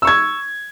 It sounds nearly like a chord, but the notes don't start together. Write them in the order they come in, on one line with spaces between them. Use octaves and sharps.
E6 C#6 G#6